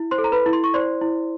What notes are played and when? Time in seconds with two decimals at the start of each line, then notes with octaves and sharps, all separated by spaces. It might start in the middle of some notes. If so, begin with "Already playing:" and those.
Already playing: E4
0.11 C5 C6
0.18 A4
0.24 A#5
0.32 B4 B5
0.46 E4
0.53 C6
0.64 C#6
0.74 C5 D5 C6
1.01 E4